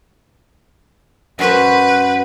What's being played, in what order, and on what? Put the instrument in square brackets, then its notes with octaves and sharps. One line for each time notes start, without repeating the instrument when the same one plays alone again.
[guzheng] F#2 F#4 C5 [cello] B4